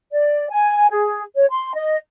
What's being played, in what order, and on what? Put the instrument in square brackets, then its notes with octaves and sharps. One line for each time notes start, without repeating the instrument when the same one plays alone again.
[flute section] D5
G#5
G#4
C#5
C6
D#5